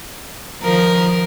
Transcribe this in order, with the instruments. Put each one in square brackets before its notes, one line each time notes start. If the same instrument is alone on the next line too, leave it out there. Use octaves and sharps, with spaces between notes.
[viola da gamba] D#3 F3 [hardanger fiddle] A#4